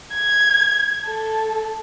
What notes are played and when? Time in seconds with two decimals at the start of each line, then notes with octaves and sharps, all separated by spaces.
0.14 G#6
1.06 A4